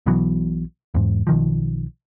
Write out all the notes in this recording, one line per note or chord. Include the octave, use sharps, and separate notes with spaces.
B1 B2 E3 F#3
E2 G#2
B1 D#3 F3